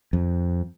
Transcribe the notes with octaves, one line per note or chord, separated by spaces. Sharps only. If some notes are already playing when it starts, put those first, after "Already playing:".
F2